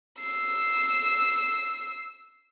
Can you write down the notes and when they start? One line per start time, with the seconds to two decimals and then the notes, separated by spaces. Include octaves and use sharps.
0.21 E6 C7